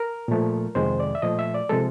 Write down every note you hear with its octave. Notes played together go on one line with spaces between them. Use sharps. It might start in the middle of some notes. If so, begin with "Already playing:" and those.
Already playing: A#4
A#2 F3 A3
F2 C3 D#3 G#3 C5
D5
E5
A#2 F3 A3 D#5
E5
D5
C3 F3 G#3 A4